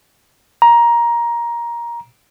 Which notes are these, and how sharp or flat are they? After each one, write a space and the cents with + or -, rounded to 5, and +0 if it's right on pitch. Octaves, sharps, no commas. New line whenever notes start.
A#5 +15